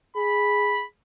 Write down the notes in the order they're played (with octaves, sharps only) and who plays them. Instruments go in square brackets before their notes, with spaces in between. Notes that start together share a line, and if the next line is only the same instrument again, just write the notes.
[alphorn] G#4 [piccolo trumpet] B5